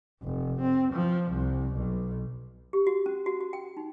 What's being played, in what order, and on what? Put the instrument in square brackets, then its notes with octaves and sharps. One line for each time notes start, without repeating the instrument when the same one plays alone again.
[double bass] F1
C4
F3
C2
B1
[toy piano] G4
F#4
C#4
F#4
F#4
G5
D#4